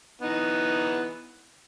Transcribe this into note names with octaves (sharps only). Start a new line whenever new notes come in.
E3 B3 D#4